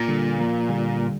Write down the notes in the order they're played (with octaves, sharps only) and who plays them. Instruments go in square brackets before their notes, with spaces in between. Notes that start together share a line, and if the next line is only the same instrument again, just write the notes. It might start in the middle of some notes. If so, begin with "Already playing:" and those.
Already playing: [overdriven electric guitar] A#2
[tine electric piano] D3 G3
F3 A#3
D3 G3